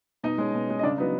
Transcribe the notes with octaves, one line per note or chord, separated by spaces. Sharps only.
B2 D#4 D#5
G#3 C#4
B2
G#3 C#4
D#5
C#3 D4 D5
F#3 B3 D#4